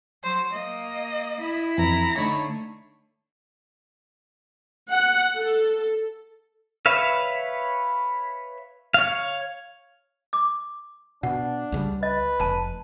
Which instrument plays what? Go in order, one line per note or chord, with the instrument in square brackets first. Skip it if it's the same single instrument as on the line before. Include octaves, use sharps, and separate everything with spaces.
[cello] F#3 [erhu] C5
[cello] A#3 [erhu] D#5
[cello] E4
[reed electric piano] F2 E3 [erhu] A#5
[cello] D3 A3 [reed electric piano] D#4 B5 [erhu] C#5
[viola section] F#5
A4
[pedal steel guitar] B4 C#5 E5 F5
C#5 F5
[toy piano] D6
[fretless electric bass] B2 [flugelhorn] D4 [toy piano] F#5
[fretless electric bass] C#2 C#3 G3
[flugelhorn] B4 [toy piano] D#5
[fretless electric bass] F1 [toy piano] A5 A#5